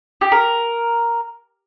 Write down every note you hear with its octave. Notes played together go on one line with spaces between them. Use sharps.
G4
A#4